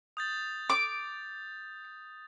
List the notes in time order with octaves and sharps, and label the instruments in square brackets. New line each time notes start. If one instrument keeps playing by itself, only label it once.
[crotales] D#6 G6 A6
[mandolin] D6